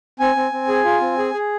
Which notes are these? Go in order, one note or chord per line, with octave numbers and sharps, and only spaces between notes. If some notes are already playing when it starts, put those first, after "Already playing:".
C4 G#5
C4
C4
G#4
F4
C4
G#4
G#4